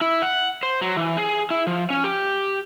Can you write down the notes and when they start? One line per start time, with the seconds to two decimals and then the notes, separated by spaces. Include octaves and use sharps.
0.01 E4
0.22 F#5
0.63 C5
0.81 F#3
0.97 E3
1.17 G#4
1.50 E4
1.67 F3
1.90 C#4
2.04 G4